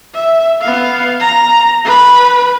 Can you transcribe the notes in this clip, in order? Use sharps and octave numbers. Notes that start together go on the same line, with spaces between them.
E5
B3 F5
A#5
B4 B5